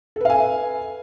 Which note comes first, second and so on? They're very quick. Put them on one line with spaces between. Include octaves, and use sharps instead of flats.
A4 B4 F5 G#5